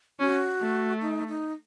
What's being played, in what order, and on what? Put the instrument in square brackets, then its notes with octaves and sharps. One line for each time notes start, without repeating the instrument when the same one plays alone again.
[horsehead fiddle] C#4 [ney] F#4
[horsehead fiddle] A3
[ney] D#4
D#4